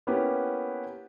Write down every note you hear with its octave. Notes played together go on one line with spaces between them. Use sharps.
A#3 B3 C#4 E4 G4 B4